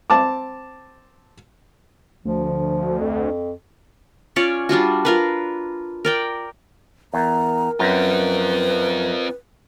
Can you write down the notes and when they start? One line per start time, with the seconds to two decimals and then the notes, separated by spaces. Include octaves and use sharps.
0.10 C4 A5 D6
2.25 D2 F3
2.99 F2
4.36 C#4 F4 C#5 D5
4.69 G3 D4 F4 F#4
5.05 F4 A#4 B4
6.05 A#4 D5 G5
7.14 E2 A#4 A#5
7.80 F#2 C4 F4 B4